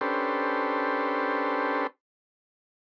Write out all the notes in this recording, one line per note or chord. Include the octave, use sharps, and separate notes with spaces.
C#4 D4 G4 A4 B4 C5